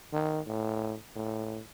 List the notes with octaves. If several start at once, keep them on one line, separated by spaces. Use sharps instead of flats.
D#3
A2
A2